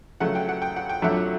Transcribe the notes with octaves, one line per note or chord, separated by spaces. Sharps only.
C#3 F#3 A3 F#5
G5
F#5
G5
F#5
G5
F2 D3 F#3 A3 E5 F#5